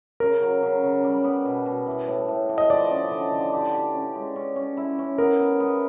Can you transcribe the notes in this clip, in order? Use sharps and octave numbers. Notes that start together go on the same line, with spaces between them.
C#3 A#4
F#3
C#3
C#3
G3
B3
B2
B2
E3
A2
A2
E3
D#5
F3 D5
C#4
D3
D3
G4
G4
C#4
G#3
C#4
C#4
E4
C#4
B3 A#4
B3
B3